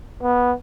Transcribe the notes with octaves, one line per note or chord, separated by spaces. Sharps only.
B3